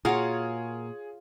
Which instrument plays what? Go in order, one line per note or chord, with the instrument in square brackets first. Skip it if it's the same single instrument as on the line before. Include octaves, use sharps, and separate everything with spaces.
[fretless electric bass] A#2 [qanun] F4 C#5 [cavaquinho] F#4 A#4 F5 [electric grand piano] G#4